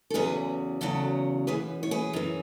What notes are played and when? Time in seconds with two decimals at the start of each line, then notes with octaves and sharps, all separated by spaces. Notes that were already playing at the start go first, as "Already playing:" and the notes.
0.10 A4
0.14 E2 C#3 F#3 G#4 B4
0.81 E2 C#3 F#3 F#4 A4
1.47 F#2 E3 G#4 B4
1.83 C#5
1.91 G#4 B4
2.13 F#2 E3